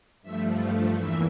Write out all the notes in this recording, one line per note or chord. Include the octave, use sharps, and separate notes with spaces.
G2 F3 A3 E5
F5
E2 E3 A#3 E5